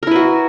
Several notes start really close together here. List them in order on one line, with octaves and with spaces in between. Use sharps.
A#4 E4 B4 F#4